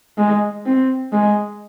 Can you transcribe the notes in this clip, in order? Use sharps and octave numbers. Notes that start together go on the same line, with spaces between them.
G#3
C4
G#3